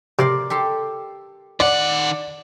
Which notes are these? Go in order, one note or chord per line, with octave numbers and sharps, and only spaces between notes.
C3 A#4 D5 C6
G4 A4 C6
D#3 D5 F#5